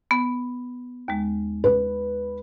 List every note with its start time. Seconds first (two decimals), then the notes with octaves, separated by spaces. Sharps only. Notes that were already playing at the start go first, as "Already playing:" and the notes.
0.11 B3
1.08 D#2 G#3
1.64 B4